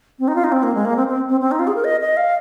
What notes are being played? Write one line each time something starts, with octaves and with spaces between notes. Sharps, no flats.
C4
D#4
F4
D#4
C4
A#3
G#3
A#3
C4
C4
C4
C4
D#4
F4
G#4
A#4
D#5
D#5
F5